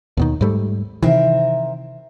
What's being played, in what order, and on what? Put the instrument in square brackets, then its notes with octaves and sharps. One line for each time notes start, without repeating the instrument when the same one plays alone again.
[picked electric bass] D#2 B2 D#3
G#2 G3 A3
[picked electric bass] C3 D#3 E3 [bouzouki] C4 A#4 E5